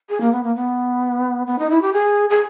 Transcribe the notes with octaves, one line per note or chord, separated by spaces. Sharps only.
G#4
A#3
B3
A#3
B3
B3
D#4
E4
G4
G#4
G#4